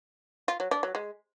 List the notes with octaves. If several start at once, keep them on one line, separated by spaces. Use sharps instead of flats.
F4
F#3
D4
F#3
G#3